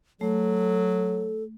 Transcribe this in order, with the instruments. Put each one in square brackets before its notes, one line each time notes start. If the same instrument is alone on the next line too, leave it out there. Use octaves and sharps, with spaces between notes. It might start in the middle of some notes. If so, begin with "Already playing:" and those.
[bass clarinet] F#3 [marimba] A3 [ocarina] A4